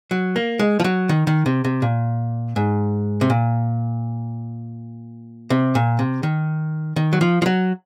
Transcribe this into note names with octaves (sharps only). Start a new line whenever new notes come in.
F#3
A#3
G#3
F3
F#3
D#3
D#3
C3
C3
A#2
G#2
C3
A#2
C3
A#2
C3
D#3
D#3
F#3
F3
F3
F#3